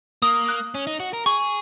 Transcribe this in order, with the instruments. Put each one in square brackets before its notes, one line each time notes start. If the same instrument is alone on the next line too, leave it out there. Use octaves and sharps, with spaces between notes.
[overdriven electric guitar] A#3 [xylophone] D#6
[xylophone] F#6
[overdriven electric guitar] C#4
D#4
F#4
A#4
[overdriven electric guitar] G#4 [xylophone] C#6